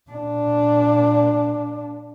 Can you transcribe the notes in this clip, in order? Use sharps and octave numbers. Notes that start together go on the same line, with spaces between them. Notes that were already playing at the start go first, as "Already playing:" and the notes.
A#2 D4